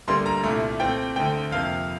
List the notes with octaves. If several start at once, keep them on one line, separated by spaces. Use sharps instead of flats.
D2 D3 G3 A#3 C6
A#5
C2 A#2 A3
A#2 A3 C4 G5
D2 D3 A3 C4 G5
F2 C3 F3 A#3 F5